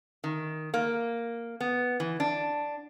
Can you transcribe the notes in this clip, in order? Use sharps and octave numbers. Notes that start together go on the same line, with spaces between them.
D#3
A#3
B3
E3
D4